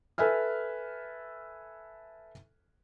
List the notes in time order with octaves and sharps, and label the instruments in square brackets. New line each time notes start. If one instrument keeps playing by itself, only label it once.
[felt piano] A4 B4 E5 G#5 F6